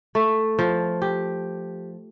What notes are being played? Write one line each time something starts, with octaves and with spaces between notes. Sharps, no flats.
A3
F3
G4